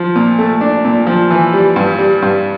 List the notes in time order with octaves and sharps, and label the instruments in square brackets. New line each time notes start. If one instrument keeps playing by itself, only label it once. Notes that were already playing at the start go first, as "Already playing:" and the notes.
Already playing: [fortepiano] F3
A#2
A3
D4
A#2
F3
E3
G3
G2
G3
G2